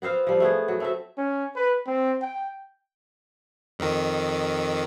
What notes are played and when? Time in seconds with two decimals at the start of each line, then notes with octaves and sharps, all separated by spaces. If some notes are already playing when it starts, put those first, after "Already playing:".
0.02 B3 C4 C5 F5
0.27 F3 G3
0.40 A3 B3 G#4
0.68 F#3
0.80 A3 C4 E5
1.18 C#4
1.56 B4
1.86 C4
2.22 G5
3.79 F2 D#3